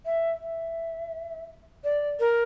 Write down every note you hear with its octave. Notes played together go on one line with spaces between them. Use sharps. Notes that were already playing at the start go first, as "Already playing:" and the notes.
E5
E5
D5
A#4